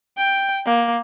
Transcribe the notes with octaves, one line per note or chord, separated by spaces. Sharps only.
G5
A#3